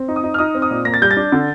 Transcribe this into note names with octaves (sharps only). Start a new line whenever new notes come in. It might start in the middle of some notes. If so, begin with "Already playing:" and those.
Already playing: C4
D#4
D#6
D#4
F6
D#4 D#6
C4
D#6
A#2
A#3 A#6
A6
G3 G6
A6
D4
D3